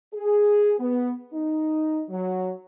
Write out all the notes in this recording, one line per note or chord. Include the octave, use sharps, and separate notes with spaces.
G#4
B3
D#4
F#3